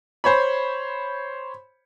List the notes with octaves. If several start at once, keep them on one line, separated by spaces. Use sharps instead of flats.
C5 C#5 B5